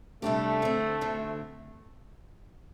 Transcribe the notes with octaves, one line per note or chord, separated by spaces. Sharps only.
C3 G3 A3 D4 G4
D2 D3 C4
D2 D3 C4